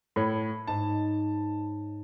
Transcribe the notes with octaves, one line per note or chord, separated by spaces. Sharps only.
A2 A4 C#5 B5
G#2 D#4 A5